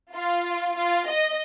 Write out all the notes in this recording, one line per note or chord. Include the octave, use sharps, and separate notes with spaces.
F4
F4
D#5